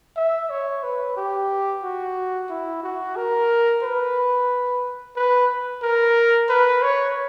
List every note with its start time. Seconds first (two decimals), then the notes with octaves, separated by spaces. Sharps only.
0.16 E5
0.50 C#5
0.83 B4
1.17 G4
1.83 F#4
2.50 E4
2.83 F#4
3.16 A#4
3.83 B4
5.16 B4
5.83 A#4
6.49 B4
6.83 C#5